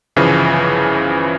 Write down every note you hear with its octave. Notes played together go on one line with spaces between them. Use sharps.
G1 C#3 E3 F3